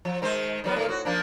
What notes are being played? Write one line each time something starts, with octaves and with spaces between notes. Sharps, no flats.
F3
D#3 G#3 C5
D#3 F#3 B3
A#2 D#3 A3
A2 F#4
F3 A#3 D4